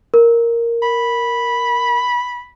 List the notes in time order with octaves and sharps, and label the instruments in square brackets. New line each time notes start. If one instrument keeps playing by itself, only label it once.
[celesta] A#4
[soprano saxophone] B5